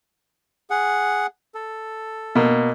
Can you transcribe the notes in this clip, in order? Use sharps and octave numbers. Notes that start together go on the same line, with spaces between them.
G#4 F#5
A4
B2 A#3